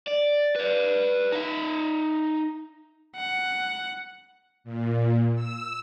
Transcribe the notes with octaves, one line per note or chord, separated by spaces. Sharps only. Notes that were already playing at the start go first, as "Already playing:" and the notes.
D5
B4 D5
D#4 E5
F#5
A#2
E6